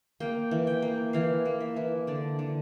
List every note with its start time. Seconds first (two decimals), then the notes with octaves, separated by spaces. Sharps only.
0.20 A#3 G5
0.51 E3
0.67 G5
0.82 A#3
1.13 E3 F5
1.45 A#3
1.60 E5
1.76 E3
2.07 D3 D5
2.39 D3